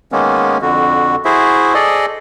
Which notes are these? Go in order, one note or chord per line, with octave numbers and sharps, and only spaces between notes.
D#3 G#3 A#3 B3 C#4
F2 D3 F#4
E4 F#4 G#4 C5 E5
G#4 A4 D5 D#5